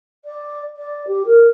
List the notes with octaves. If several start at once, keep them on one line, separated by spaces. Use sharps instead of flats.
D5
D5
G4
A#4